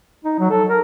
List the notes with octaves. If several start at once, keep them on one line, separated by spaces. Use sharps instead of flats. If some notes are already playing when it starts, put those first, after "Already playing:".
D#4
F#3
A4
A#4